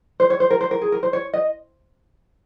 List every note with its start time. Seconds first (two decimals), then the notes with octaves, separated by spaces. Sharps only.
0.20 C5
0.30 C#5
0.40 C5
0.50 A#4
0.61 C5
0.71 A#4
0.81 G#4
0.92 A#4
1.03 C5
1.13 C#5
1.33 D#5